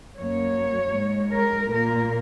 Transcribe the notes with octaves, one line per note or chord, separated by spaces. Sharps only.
F#2 F#3 A#3 C#5
G#2 G#3
A#4
A#2 A#3 A#4